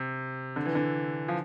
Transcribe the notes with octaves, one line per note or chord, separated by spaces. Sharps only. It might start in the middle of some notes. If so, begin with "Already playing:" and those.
Already playing: C3
D3
E3
D3
F3